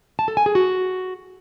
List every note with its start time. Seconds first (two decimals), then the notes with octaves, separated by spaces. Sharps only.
0.19 A5
0.28 A4
0.37 G#5
0.46 G#4
0.55 F#4